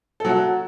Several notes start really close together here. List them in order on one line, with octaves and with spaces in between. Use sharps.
A4 F#3 F#4